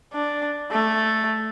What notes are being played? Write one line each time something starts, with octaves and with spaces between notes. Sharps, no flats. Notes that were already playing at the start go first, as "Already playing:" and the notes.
D4
A3